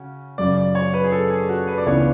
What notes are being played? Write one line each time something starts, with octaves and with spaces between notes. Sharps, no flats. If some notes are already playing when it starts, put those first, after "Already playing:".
Already playing: C#3 C#4 F#4
F#2 C#3 F#3 C#4 D5
D5
C#5
B4
G#4
A4
G#4
F#4
B4
D5
C#2 C#3 E3 B3 D4 C#5